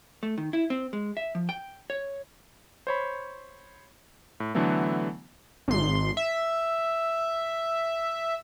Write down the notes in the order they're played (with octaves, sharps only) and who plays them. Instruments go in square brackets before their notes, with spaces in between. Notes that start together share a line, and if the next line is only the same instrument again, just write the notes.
[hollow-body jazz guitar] A3
D#3
E4
C4
G#3
E5
F3
G5
C#5
[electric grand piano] C5 C#5 B5
A2
D3 E3 F#3 A3 B3
[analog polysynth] G#1 C6
E5